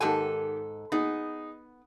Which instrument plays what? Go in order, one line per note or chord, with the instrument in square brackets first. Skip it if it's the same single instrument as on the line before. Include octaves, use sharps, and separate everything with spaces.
[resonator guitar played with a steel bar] G#2 A4 G#5 [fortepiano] D#3 G4 F#5
[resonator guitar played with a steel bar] B3 [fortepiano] D#4 G#4